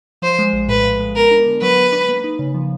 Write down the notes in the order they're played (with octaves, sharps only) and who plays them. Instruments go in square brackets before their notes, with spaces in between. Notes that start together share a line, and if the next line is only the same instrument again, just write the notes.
[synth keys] F3 [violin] C5
[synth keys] G#3
A#1
[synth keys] A2 [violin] B4
[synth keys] F3
G#3
[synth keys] B3 [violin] A#4
[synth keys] D4
D3
[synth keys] F#3 [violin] B4
[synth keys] B3
D4
A#3
D#4
C#3
F3